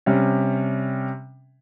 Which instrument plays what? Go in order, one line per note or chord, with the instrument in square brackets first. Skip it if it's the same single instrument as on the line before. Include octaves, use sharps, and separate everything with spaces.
[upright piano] C3 G3 C#4